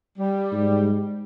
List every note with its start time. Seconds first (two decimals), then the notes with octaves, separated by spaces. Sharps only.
0.18 G3
0.52 G#2